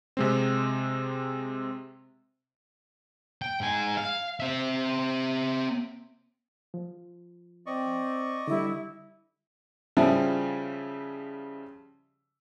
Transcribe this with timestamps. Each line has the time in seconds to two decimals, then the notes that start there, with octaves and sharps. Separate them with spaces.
0.17 C3 G#3 C4
3.42 G5
3.61 G#2 G#5
3.97 F5
4.40 C4 E5
6.74 F3
7.66 C4 D5 D#5 C#6
8.48 D3 G3 E4
9.97 C#3 F3 G3 E4